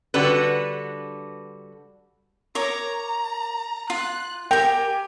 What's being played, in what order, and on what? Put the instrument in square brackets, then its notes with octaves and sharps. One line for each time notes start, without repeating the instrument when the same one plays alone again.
[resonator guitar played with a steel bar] D3 G3 F#4 B4
[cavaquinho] A#4 C#5 D6 [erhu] A#5
[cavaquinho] F4 [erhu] F#6
[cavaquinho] G4 A#4 [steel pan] G5 [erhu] G#5